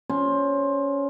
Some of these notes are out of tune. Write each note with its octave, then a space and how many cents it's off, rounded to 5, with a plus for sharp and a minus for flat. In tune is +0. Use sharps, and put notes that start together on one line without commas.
C#4 +15 C5 +15